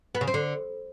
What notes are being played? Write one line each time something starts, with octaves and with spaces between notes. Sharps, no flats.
B3
C#3
C4
D3